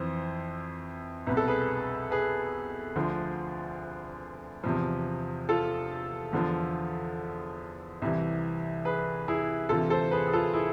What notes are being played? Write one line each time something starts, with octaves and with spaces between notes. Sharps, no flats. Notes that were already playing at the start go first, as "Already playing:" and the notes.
Already playing: F2 E3 C5
C2 B2 B4
A4
G#4 B4
G#4 B4
D2 D3 F3
E2 C3 F3
F4 A4
E2 D3 F3
C2 C3 E3
G#4 B4
E4 G#4
D2 C3 E3 F4 A4
A4 C5
G#4 B4
G#4
F4 A4
E4 G#4